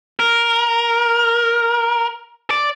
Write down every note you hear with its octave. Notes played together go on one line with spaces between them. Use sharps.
A#4
D5